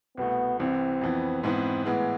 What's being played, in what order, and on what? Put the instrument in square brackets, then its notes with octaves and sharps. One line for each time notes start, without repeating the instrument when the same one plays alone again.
[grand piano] C2 B2 A3 [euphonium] B3
[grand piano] C2 C3 E3 [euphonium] C4
[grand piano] F2 E3 B3
[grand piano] G#2 E3 B3 [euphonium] C4
[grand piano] A2 E3 G#3 [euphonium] B3